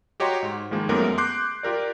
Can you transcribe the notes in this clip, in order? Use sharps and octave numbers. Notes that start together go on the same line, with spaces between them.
F#4 G4 C#5 D#5 A#5 C6
G#2
D#3 F3 G#3 A#3
F#2 G#3 A3 B3 A#4 D6
C6 D6 F#6 G6 C7
F4 G4 A#4 D5